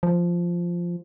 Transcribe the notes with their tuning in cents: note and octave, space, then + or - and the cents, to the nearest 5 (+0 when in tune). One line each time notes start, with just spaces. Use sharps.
F3 -5